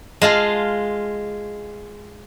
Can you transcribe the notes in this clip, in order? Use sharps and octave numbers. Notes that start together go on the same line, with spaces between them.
G#3 F4 F5 A5